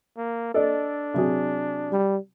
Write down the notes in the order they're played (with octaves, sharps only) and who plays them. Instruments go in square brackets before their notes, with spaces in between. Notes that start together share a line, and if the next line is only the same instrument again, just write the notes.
[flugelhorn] A#3
[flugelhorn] D4 [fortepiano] A4 D5 D#5
[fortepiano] C3 F#3 G#4
[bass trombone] G3